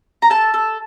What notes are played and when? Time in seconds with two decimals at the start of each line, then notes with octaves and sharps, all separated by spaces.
0.22 A#5
0.30 A4 A5
0.54 A4